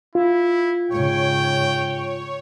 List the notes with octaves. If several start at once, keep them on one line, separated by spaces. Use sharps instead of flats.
E4 F4
G#2 C#3 C#5 G5